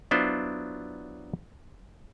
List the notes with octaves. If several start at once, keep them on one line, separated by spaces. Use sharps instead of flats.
F#3 B3 D4 E4 F4 C5